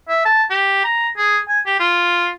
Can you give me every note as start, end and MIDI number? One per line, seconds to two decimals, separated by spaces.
0.09 0.22 76
0.25 0.43 81
0.50 0.81 67
0.84 1.08 82
1.17 1.38 68
1.48 1.60 80
1.66 1.79 67
1.80 2.29 65